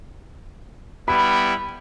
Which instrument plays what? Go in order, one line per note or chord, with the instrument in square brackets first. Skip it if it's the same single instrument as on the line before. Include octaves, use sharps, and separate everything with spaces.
[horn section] G3 B3 E4 [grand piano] B5